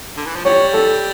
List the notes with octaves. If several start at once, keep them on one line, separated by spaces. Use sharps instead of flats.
D3
E3
F3
G3 C#5
A4